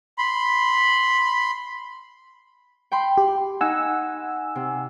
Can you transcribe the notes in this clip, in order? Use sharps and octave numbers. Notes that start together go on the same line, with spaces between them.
B5 C6
G5 B5 C6
G4
D#4 F#5 G#5 E6
C3